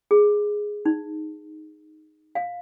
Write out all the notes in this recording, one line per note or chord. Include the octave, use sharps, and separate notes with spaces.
G#4
D#4
F5